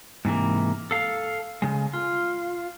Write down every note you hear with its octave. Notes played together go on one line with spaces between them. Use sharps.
G#2 C3 E3 A#3
A4 F5
C#3 G#3
F4